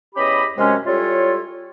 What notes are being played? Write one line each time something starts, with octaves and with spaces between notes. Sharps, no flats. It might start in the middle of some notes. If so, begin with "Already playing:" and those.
E2 C#4 G4 D#5 B5
F#2 C3 G#3 C#4
G3 E4 F4 A4 C#5